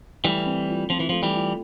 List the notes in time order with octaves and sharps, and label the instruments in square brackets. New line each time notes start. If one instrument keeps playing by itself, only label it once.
[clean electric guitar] E3 G3 [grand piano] A3
[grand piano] C4
F4
[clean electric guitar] F3 [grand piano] C4
[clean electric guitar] E3
[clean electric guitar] F3 [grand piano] A3
[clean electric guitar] E3 G3
[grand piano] F4